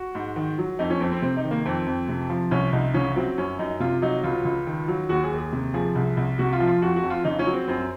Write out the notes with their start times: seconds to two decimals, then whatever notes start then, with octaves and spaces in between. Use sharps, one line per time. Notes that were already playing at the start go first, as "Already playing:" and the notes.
Already playing: F#4
0.15 G#2
0.36 D#3
0.58 F#3
0.79 F2 D#4
0.90 C#4
1.01 F2 C4
1.12 C4
1.22 C3 C4
1.37 D#4
1.44 D#3
1.51 A#3
1.65 F2 C4
1.87 F2
2.09 C3
2.30 F3
2.51 C2 C#4
2.73 C2 D#4
2.94 C#3 C#4
3.16 F#3 C4
3.38 F#2 C#4
3.59 F#2 D#4
3.80 C3 F4
4.02 F#3 D#4
4.24 C#2 F4
4.45 C#2
4.67 D#3
4.88 F#3
5.09 D#2 F#4
5.24 G#4
5.32 D#2
5.38 G#4
5.52 C3
5.74 F3 G#4
5.95 C2
6.17 C2
6.39 C3 F#4
6.53 F4
6.60 F3
6.67 F4
6.82 F2 F#4
6.96 F#4
7.03 F2
7.10 F4
7.24 C#3 D#4
7.39 C#4
7.46 F#3
7.53 C4
7.68 F#2 C4